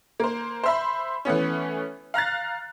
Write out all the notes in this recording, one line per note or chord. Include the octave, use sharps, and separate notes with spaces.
A#3 C5
C5 E5 B5
E3 A3 B3 C#4
F5 A#5 F#6 A6